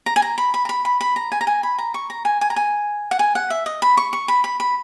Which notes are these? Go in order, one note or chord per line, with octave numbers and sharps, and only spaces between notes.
A#5
G#5
A#5
B5
B5
A#5
B5
B5
B5
A#5
G#5
A#5
G#5
B5
A#5
C#6
A#5
G#5
G#5
A#5
G#5
F#5
G#5
F#5
E5
D#5
B5
C#6
C#6
B5
B5
B5